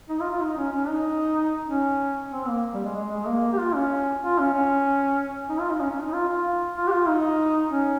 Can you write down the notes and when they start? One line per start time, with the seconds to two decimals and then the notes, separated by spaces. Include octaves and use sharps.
0.09 D#4
0.20 F4
0.31 F4
0.41 D#4
0.57 C#4
0.73 C#4
0.89 D#4
1.68 C#4
2.32 C4
2.48 A#3
2.74 G3
2.85 G#3
2.95 G#3
3.11 G#3
3.27 A#3
3.53 G4
3.58 F4
3.75 C#4
4.23 F4
4.38 C#4
4.54 C#4
5.49 D#4
5.60 F4
5.70 D#4
5.81 C#4
5.91 C#4
6.02 D#4
6.13 F4
6.28 F4
6.76 F4
6.87 G4
6.92 F4
7.08 D#4
7.71 C#4